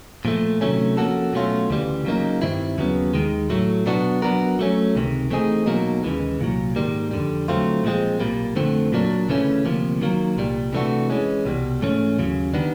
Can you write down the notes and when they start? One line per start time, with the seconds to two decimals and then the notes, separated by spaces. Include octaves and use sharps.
0.25 A#2 F3 A3
0.61 C3 D#3 F#3 A3 C#4
0.97 F3 A#3 C#4 F#4 A4
1.33 B2 F#3 A3 C#4 F4
1.70 D2 C#3 E3 G3
2.05 C#3 F#3 A#3 D#4
2.42 G2 D#3 G3 C4 E4
2.78 D#2 C#3 F#3 B3
3.14 D#2 D#3 G#3
3.50 A2 F#3 A3
3.86 B2 F#3 B3 D4 F#4
4.22 F#3 B3 D4 F#4 A#4
4.59 F#3 A3 C#4
4.95 C#2 C3 D#3
5.30 E3 A3 C4 D#4 G#4
5.66 B2 F#3 A#3 D#4
6.03 D#2 C#3 E3 G#3
6.39 C2 A#2 F#3
6.76 G#2 D#3 G3 A#3
7.11 F2 D3 G3
7.48 D3 F#3 A3 C4 F4
7.84 A#2 F3 G#3 C4
8.20 B1 A#2 G3 A#3
8.56 F2 D3 F3 A3 C4
8.92 A#2 F#3 A#3 D4
9.29 D2 C#3 E3 A3 C#4
9.65 D2 C3 F3 A#3
10.01 D#3 F#3 A#3
10.37 C2 A#2 G3
10.73 C3 E3 A3 D4 F#4
11.10 E3 G#3 C#4
11.45 C2 B2 G3
11.82 G#2 E3 A3 C#4
12.19 D#2 C#3 F#3
12.54 D#3 G3 B3 D4